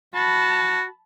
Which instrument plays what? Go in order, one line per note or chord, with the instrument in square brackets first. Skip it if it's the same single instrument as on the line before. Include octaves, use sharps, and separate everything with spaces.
[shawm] F#4 [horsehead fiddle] A5 B5